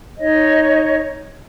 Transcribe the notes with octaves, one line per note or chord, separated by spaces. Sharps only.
D#4 C#5 D#5